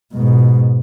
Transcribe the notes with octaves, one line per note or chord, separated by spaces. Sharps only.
G#2 B2